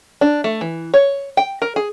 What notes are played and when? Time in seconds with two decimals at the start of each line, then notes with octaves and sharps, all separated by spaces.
0.21 D4
0.44 A3
0.61 E3
0.94 C#5
1.37 G5
1.62 A#4
1.76 G#4